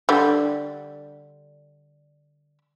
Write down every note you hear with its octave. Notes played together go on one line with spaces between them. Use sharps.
D3 G3